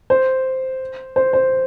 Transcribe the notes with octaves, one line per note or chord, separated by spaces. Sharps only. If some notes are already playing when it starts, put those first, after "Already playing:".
C5
C5
C5